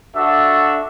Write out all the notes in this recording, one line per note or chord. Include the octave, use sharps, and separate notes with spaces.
D4 F#4 A4 E5